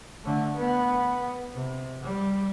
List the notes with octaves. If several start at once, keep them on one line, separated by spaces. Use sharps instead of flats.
D3 A3
B3
C3
G3